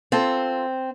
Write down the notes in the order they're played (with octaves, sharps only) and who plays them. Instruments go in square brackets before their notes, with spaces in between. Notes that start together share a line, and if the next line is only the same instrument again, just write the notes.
[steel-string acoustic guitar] C4 [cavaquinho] F4 A4